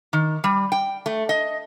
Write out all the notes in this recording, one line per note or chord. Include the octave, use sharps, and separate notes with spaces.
D#3
G3
G5
A3
D#5